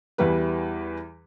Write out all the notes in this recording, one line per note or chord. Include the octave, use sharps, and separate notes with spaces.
E2 E3 G3 B4